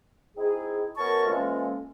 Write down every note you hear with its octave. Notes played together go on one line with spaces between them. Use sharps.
C4 D#4 E4 G#4
F#2 B3 A#4 C#5 A5 C#6
E3 F3 G#3 A#3 C#4 A4